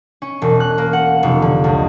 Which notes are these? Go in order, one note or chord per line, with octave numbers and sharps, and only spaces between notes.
C#4
E1
F#6
A#3
F#5
F1
D3
C#2